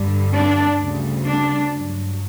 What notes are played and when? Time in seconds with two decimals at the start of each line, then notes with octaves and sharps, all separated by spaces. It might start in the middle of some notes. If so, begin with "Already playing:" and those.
Already playing: G2 D3 G3
0.32 D4
0.79 D2 C#3 G3
1.26 D4
1.73 G2 F#3